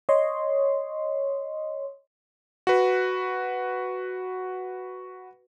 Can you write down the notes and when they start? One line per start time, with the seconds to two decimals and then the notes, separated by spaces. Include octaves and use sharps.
0.09 C#5 D#5 C6
2.67 F#4 B4